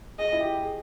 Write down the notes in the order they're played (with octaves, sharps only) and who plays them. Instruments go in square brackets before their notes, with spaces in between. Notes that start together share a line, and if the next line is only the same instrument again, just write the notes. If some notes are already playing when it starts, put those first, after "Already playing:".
[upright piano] G#4 [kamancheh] D#5
[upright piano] E4
G4
G#4